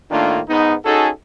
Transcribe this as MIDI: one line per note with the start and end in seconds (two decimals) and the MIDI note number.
0.11 0.40 45
0.11 0.40 51
0.11 0.40 57
0.11 0.40 58
0.11 0.40 62
0.11 0.40 65
0.49 0.75 44
0.49 0.75 59
0.49 0.75 63
0.85 1.09 61
0.85 1.09 63
0.85 1.09 66
0.85 1.09 68
0.85 1.09 69